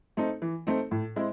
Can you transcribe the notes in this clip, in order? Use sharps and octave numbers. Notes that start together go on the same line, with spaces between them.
A3 C4 D#4
E3
A3 C4 D#4
A2
G#3 C4 E4